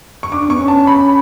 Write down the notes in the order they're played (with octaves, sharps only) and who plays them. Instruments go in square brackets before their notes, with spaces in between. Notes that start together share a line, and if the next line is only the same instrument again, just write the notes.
[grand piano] C#6
[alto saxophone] D4 [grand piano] D6
[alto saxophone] B3 [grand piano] C#6
[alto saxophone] C#4
[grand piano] A5
B5